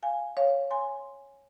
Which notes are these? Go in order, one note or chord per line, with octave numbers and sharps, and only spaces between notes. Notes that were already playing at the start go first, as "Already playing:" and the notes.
F5 G#5
C#5 F5
G#5 C6